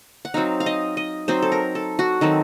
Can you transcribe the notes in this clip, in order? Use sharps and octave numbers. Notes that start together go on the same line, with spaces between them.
F#5
F#3 C4 D#4 F5
F5
D#5
D#5
F#3 C4 D#4 C5
A4
A#4
A4
F#4
D#3 F#3 C4 A4